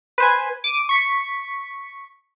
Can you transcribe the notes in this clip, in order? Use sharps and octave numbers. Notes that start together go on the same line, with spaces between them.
B4 C5 G#5
D6 D#7
C#6 B6